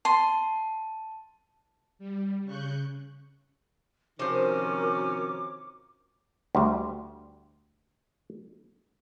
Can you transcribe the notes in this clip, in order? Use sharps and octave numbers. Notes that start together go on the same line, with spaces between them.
A5 C6
G3
C#3 C#6 F#6 G6
C3 D#3 F3 C#4 F#4 A#4 C5 D6
D2 G3